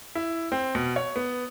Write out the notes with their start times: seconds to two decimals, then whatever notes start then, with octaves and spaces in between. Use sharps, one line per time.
0.15 E4
0.52 C4
0.75 B2
0.96 C#5
1.16 B3